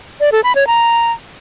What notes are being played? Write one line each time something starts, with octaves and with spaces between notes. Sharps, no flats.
D5
A4
B5
C#5
A#5